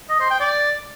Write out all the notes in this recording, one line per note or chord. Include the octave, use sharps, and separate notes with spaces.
D#5
C5
G5
D5